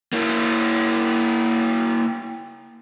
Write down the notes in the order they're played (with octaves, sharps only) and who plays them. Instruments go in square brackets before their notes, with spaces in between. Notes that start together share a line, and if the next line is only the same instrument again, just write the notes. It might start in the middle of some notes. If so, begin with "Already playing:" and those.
[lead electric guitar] A#3 E4